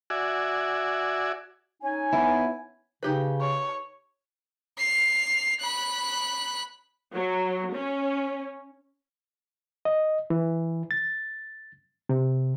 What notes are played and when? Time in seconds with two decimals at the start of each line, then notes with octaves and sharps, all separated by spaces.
0.10 F#4 D5 E5 G#5
1.82 C#4 D#4 G#5
2.13 B3 E4
3.03 C#3 D#4 G4 B4
3.41 C#5
4.78 C7 F7
5.60 B5 F#6
7.13 F#3
7.76 C#4
9.85 D#5
10.30 E3
10.91 A6
12.09 C3